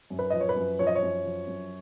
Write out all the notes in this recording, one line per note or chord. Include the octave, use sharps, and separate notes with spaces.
F#2
B4
F3 D#5
C#5
B4
F#2
F3 C#5
D#5
C#5
F#2
F3
F#2